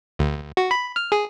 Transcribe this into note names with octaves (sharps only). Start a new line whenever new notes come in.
D2
F#4
B5
F6
G#4